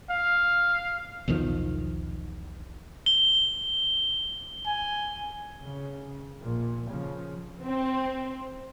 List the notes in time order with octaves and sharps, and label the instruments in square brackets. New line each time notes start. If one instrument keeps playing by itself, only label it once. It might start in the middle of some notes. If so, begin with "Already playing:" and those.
[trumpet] F5
[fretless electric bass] B1 E2 D#3 F3
[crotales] G7
[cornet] G#5
[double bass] C#3
A#1 A#2
C#3 F3
[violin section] C4